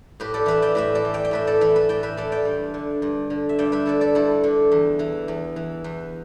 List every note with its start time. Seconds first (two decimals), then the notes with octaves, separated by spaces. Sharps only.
0.20 A2 G4 B4
0.34 A4 D5
0.46 E3 B4 E5
0.62 D5 G5
0.75 A2 B4 E5
0.95 A4 D5
1.05 E3
1.14 D5 G5
1.25 G5
1.31 A2 B4 E5
1.47 A4 D5
1.61 E3 B4 E5
1.76 B4 E5
1.89 A2 D5 G5
2.03 B4 E5
2.17 E3 A4 D5
2.32 D5 G5
2.45 G2
2.74 D3
3.02 G2
3.30 D3
3.49 E5
3.59 G2 D5 G5
3.72 B4 E5
3.86 D3 A4 D5
4.01 A4 D5
4.15 G2 E4 A4
4.44 D3
4.72 E2
4.99 E3
5.28 E2
5.56 E3
5.84 E2